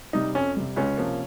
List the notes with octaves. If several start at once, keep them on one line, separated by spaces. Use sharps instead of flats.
C3 G3 D#4
F2 C#4
C3 G3
C#2 C#4
C3 F3 A#3